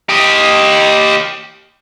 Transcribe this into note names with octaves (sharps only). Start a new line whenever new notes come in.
G4 D#5